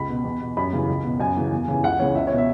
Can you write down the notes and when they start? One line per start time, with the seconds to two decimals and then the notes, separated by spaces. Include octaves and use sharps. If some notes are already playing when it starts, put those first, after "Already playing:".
Already playing: C#2 B5
0.09 B2
0.24 E2
0.41 B2
0.57 F#2 B5
0.73 C#3 E3
0.88 C#2
1.04 B2
1.20 F#2 G#5
1.37 C#3 E3
1.52 E2
1.68 C#3 E3
1.83 C#2 F#5
1.99 C#3 E3 C#5
2.15 C#2 E5
2.27 B2 C#5
2.38 E5